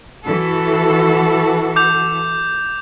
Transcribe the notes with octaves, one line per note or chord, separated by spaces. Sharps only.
E3 F#4 A4
D6 G6 F7